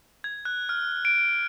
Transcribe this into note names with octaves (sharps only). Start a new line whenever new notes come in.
G#6
F#6
F6
D7